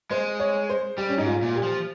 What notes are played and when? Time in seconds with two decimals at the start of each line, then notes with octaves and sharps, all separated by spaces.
0.11 G#3 C5
0.39 C#5
0.69 C5
0.98 G3 G4
1.09 C#4
1.18 G#2 D#4
1.27 F4
1.42 A#2
1.56 G4
1.63 F3